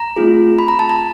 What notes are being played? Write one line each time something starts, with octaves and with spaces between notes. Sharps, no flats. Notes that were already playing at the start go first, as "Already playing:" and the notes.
Already playing: A#5
A3 C4 F4 G#4
B5
A#5
A5
A#5